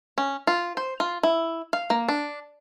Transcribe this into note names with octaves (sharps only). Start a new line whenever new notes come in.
C#4
F4
C5
F4
E4
F5
A#3
D4